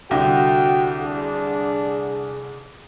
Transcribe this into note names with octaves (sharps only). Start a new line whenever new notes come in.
C2 D3 F#4 G5
D4 G#4